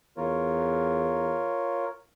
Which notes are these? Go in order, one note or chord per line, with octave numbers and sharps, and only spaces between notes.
E2 F4 A#4 C#5